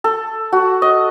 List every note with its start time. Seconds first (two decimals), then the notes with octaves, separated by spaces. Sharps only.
0.04 A4
0.52 F#4
0.82 D#5